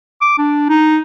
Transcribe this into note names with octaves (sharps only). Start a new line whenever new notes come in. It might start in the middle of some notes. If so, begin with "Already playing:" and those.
D6
D4
D#4